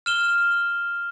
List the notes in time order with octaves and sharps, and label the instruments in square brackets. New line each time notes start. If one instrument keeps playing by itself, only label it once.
[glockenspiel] F6 E7 G7